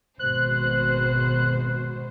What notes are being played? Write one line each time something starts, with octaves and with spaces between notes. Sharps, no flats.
G#1 B2 C5 F#6